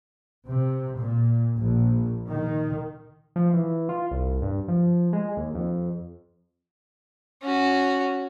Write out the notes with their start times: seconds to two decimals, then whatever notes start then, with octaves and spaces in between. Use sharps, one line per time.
0.47 C3
0.97 A#2
1.57 A#1
2.29 D#3
3.36 F3
3.54 E3
3.89 F4
4.11 C2
4.42 G2
4.68 F3
5.13 G#3
5.37 D#2
5.55 F2
7.42 C#4 F#4